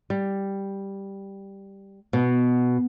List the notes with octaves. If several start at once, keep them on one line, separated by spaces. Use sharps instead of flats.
G3
B2